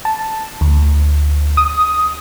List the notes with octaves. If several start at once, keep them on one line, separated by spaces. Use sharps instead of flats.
A5
D2
D#6